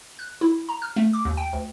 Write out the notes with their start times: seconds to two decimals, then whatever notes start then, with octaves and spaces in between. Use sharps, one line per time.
0.19 F#6
0.41 E4
0.69 A#5
0.82 F6
0.96 A3
1.13 D6
1.25 D#2
1.37 G5
1.53 D2